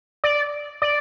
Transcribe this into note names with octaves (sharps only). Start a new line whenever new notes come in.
D5
D5